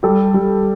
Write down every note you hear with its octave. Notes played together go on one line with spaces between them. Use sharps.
G3 G4 A4
G3